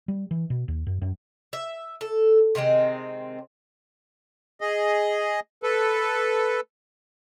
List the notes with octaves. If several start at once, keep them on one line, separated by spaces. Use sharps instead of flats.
G3
E3
B2
D#2
F#2
F#2
E5
A4
C3 D#3 G#3 C4
G#4 D#5
A4 B4